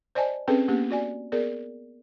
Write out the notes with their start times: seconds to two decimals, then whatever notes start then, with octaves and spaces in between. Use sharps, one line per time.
0.15 C5 D5 D#5 G#5 A5
0.48 C4 C#4 G#4 A4 B4
0.68 A#3 B3 C#4 G4
0.90 F#4 D5 G#5
1.32 B3 G#4 A#4 D5